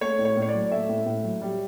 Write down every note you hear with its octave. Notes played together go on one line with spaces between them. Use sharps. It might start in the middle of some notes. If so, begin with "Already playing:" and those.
A3 C#5
A2
C#5
A2
C#5
D5
F#3
A3 E5
A2
A2
F#3
G3